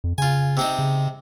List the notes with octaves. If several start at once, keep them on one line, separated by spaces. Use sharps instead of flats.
F2
C#3 F4 G#5
C3 C4 D#4
C#3